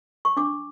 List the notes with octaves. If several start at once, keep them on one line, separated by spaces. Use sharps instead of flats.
C#6
D4 D6